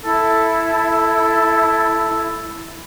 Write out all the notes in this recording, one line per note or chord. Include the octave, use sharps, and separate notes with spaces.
E4 A4
A4